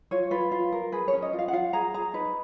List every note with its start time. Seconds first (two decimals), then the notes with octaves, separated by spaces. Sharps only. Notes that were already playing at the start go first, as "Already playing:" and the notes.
0.11 F4 C#5
0.31 F4 B4
0.52 F4
0.73 A#4
0.92 G#4 B4
1.08 C#5
1.13 C#4
1.22 D#5
1.33 F4
1.39 F5
1.48 F#5
1.53 F4 F5
1.73 G#4 A#5
1.94 G#4 A#5
2.14 D#4 B4